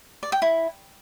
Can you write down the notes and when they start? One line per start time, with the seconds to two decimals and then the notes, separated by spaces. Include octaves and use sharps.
0.23 D5
0.32 G5
0.42 E4